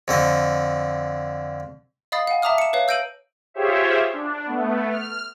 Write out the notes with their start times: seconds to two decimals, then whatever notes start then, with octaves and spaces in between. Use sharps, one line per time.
0.08 F2 D3 D#5
2.12 D#5 F5 B5 D#6 A6 C7
2.27 F5 F#5 G#5
2.42 E5 A5 A#5 D6 D#6 F6
2.58 C#7 E7
2.73 B4 C#5 F5
2.88 E6 G6 A#6 D7 D#7 F#7
3.54 F4 G4 G#4 C5 C#5 E5
4.13 D4
4.46 A3 B3
4.89 F6